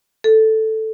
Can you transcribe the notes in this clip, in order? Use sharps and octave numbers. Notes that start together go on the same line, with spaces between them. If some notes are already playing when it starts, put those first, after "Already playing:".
A4